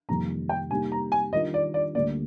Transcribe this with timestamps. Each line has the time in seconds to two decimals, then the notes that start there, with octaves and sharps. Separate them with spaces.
0.09 F2 C3 D#3 G3 A#3 A#5
0.49 G5
0.70 C3 G3 A#3 D#4 G4 G#5
0.92 A#5
1.12 G#5
1.33 D#3 G3 D4 F4 A#4 D#5
1.54 D5
1.74 D5
1.95 D2 D3 G3 A#3 D5